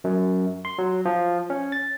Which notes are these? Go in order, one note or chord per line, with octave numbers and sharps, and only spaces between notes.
F#2
C6
F#3
F3
C#4
A6